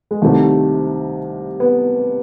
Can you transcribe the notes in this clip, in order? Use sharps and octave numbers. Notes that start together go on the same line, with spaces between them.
G#3
C2 C3 D#3 A3
B3